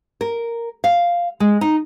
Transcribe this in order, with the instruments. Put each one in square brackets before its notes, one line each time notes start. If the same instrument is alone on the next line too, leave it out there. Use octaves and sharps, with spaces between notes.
[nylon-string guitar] A#4
F5
G#3
D#4